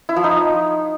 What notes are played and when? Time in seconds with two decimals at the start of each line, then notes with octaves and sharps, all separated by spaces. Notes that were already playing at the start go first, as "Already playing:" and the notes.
0.09 E4
0.16 F3
0.24 D#4